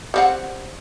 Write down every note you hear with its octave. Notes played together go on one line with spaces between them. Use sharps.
G3 C4 F#5